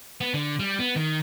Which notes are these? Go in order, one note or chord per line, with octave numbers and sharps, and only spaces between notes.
B3
D3
G3
B3
D#3